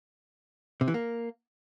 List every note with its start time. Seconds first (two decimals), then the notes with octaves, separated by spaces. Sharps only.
0.81 C3
0.88 E3
0.94 A#3